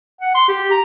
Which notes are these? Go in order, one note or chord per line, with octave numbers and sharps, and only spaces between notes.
F#5
C6
G4
A#5